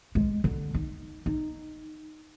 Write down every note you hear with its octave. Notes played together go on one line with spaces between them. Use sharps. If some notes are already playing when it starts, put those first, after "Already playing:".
G#3
D3
D#4
D#4